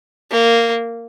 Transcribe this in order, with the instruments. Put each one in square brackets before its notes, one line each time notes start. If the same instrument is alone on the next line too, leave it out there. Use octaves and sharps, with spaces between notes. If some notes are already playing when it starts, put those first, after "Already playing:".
[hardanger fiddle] A#3